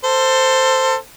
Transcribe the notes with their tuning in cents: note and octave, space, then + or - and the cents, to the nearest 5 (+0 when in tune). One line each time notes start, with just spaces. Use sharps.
A4 +25 C5 +0